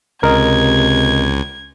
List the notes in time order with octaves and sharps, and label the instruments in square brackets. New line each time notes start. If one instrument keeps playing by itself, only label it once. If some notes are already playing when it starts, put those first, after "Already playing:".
[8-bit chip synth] C#2 [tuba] C3 [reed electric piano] A#4 D#5 [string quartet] G#6